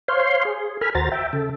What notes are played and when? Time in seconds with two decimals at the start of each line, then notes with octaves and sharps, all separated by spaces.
0.08 C5 C#5 F5 C6
0.45 G#4
0.81 A4 A#4 G#5 B5 F6
0.95 D#2 F#4 C5 A#5 A6
1.12 E5 G5
1.33 C#3 A4